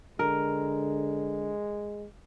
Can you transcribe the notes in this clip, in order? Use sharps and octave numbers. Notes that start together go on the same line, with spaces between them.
D3 G#3 A#4